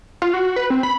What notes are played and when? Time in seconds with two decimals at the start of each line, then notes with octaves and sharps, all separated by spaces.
0.22 F4
0.33 F#4
0.56 B4
0.70 C4
0.83 B5